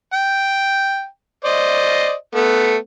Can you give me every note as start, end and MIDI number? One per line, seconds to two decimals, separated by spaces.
0.13 1.06 79
1.45 2.13 72
1.45 2.13 74
1.45 2.13 75
2.35 2.76 57
2.35 2.76 59